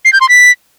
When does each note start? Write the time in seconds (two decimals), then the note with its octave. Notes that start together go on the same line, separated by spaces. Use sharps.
0.05 C7
0.13 G6
0.21 C6
0.29 B6